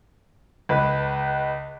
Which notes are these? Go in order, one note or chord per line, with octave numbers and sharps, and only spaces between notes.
C#2 B4